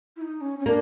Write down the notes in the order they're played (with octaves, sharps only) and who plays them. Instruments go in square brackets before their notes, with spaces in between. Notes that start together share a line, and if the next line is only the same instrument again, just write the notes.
[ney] E4
D#4
C#4
C#4
[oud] A#3 [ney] D4